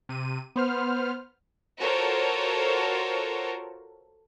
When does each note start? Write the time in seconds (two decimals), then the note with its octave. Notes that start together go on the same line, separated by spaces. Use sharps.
0.09 C3 D#7
0.56 B3 C5 F6
1.80 F4 F#4 A4 A#4 C5 C#5